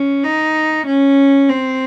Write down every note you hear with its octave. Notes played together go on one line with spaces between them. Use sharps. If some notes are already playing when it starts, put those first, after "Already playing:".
Already playing: C#4
D#4
C#4
C4